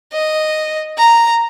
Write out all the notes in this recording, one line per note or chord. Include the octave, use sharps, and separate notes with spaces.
D#5
A#5